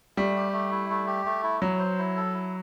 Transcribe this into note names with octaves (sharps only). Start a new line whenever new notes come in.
G3 A3
G4
A3
E4
A3
G4
A3
E4
F#3 E4
C5
E4
A4
E4